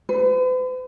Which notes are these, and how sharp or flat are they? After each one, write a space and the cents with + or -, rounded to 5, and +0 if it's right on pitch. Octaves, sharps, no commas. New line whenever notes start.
B4 +45